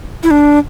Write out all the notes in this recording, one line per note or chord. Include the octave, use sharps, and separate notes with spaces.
E4
D4